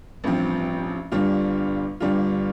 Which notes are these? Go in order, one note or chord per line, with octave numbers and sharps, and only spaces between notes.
A1 G2 F3 C4
G1 G2 G3 D4 F4
G1 G2 G3 D4 F4